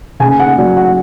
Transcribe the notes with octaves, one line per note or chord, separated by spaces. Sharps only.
C#3 G#5
F#5
F#3 D5
F#5